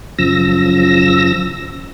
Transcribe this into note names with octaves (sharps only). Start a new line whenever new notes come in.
F#2 C#3 F3 E6 A#6